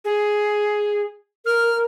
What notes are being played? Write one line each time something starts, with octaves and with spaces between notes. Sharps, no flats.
G#4
A#4 F6